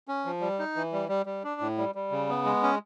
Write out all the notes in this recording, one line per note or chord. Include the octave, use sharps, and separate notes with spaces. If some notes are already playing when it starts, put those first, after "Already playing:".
C#4
F3
G3
D#4
E3
G3
G3
G3
D4
A2
G3
G3
C#3
B3
G#3
C#4